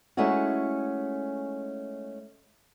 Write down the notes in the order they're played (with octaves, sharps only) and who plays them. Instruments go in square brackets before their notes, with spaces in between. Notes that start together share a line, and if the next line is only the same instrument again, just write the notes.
[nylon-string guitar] G#3 A3 C#4 D#4 E4 F#4